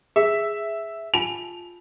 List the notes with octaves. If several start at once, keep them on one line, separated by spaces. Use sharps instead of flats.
G#4 E5
F4 G#5 A5 F7